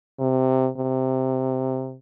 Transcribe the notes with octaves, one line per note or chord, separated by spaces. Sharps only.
C3
C3